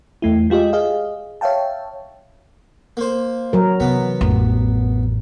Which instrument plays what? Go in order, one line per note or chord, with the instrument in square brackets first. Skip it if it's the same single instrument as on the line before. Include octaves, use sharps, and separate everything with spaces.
[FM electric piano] E2 A3 E4
G#3 F4 G4 G#4 D#5
G#4 D#5 F5
C#5 E5 F5 G5 A5
[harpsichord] A#3 C5
[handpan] F#3 A#4
[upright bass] C3 E3 [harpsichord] B3
[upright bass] A1 F2